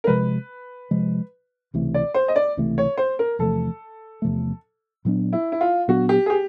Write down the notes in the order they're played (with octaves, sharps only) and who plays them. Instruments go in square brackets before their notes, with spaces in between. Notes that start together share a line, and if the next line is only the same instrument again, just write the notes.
[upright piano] A#4
[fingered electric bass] C3 F3 G#3 [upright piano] B4
[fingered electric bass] C3 F3 G#3
C#2 C3 E3 A3
[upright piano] D5
C5
D#5
D5
[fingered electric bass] C#2 C3 E3 A3
[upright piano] C#5
C5
A#4
[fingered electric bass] E2 C3 F3 A3 [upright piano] A4
[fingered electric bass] E2 C3 F3 A3
A#2 F#3 B3 D4
[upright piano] E4
E4
F4
[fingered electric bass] A#2 F#3 B3 D4 [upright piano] F#4
[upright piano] G4
G#4
G4